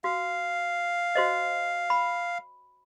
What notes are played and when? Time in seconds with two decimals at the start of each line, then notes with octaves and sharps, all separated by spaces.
0.04 F#4 F5
1.15 F#4 C5 D#5
1.90 B5